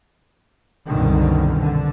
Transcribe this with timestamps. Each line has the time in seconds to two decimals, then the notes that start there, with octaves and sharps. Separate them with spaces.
0.85 C2 F#2 B2 D3 D#3
1.60 D3